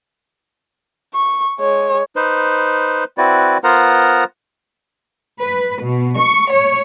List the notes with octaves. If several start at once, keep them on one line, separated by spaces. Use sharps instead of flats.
C#6
G#3 C#5
D#4 B4 C5
C4 E4 F#4 B4 D5
B3 F4 A#4 C5 F#5 A#5
B4
B2
C#6
C#5